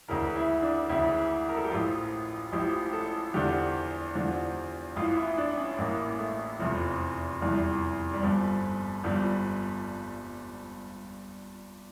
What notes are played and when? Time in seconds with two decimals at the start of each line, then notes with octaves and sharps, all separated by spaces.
0.08 D2 C#3 E3 A#4
0.36 E4
0.62 D4
0.89 D2 C#3 E3 E4
1.49 A#4
1.56 A4
1.64 G4
1.71 A1 A2 F3 F4
2.52 A1 A2 F3 G4
2.93 A4
3.34 E2 D3 F3 G4
4.15 E2 D3 F3
4.96 A1 A2 E3 F4
5.17 E4
5.38 D4
5.58 C#4
5.78 A1 A2 E3 A#3
6.19 A3
6.59 F1 E2 E3 F3
7.41 F1 E2 E3 G3
8.14 G3
8.22 G1 G2 F3
9.04 G1 G2 F3 G3